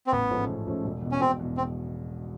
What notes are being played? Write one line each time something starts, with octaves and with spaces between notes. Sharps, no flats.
C4
A1 B3
G#2 F3 A3 C#4
A1
G#2 F3 A3 C#4
E1
E2 B2
C#4
E1 C4
E2 B2
C4